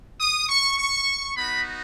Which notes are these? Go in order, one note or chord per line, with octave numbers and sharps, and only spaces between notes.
D#6
C#6
C#6
B3 D#4 F#4 B5